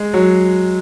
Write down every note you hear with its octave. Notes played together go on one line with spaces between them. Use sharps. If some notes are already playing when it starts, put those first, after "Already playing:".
Already playing: G#3
F#3